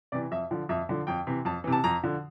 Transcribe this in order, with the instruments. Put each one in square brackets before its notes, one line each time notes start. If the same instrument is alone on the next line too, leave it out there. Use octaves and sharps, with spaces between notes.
[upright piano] C3 E3 D5
F2 E5
D3 F3
F2 E5
D3 F3
F2 G5
C3 E3
F2 A5
C3 E3
A5
F2 A#5
D3 F3